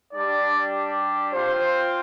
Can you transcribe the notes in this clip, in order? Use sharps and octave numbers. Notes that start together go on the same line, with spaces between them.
G3 D4 G4 D5
C4 F4 C5